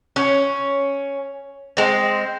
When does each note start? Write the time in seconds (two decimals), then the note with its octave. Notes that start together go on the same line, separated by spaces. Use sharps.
0.16 C#4
1.77 G#3 C4